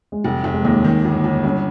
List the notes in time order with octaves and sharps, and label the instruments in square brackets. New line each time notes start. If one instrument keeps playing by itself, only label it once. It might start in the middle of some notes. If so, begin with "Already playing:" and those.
[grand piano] G#3
[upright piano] F1 [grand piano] G3
[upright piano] F1
[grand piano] G#3
[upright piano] D#2 [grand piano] A#3
[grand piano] G#3
[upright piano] D#3 [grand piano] A#3
[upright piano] G1
[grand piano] A#3
[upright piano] G1
[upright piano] G2 [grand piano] C#4